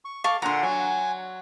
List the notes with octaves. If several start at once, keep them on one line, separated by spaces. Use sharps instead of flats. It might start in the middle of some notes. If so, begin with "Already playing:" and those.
C#6
A4 F5 C#6 D6
A#2 D3 F#5 A#5 C6
F#3 G#5